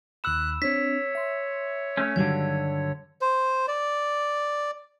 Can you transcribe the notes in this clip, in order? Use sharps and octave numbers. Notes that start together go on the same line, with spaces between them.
D#2 B5 E6 F#6 E7
C4 D4 C#5 B6
E5 C6
A3 C#4
G2 D3 D#3 F#3 G3 G#6
C5
D5